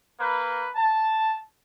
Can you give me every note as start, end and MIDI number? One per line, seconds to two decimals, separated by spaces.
0.20 0.69 58
0.20 0.69 71
0.76 1.40 81